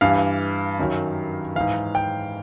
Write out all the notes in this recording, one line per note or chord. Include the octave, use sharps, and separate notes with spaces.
G2 E3 F5
F#2 D#3 F#3
G#2 E3 F5
G5